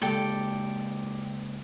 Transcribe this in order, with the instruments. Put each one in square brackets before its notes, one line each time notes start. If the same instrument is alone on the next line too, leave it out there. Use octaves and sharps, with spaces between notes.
[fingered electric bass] C#3 G#3 A#3 [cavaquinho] G4 A4 D5